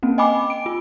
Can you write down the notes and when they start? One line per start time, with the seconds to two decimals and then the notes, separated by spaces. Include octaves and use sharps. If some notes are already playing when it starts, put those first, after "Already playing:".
0.03 A#3 C4 C#4
0.18 D#5 G5 G#5 B5 D6
0.50 D7
0.66 F4